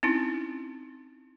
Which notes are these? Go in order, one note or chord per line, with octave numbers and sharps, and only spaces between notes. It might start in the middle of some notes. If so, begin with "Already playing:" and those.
C4 C#4 D#4 E4